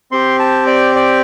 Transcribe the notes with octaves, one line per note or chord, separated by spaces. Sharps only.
C4 G4 C6
A5
D5
D5